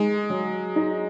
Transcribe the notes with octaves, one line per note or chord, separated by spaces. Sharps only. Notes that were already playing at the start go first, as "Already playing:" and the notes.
Already playing: G#3 D#4
F#3
D#4